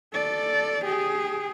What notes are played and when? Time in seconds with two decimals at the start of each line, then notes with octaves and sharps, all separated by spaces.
0.13 A4 D5
0.84 G4 G#4